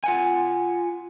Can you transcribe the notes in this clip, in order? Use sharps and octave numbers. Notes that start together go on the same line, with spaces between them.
F4 F#5 G#5